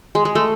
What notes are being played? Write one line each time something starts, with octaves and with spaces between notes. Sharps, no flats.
G#3
G#3
A3